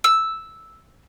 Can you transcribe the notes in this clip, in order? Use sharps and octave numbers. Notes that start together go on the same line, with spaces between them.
E6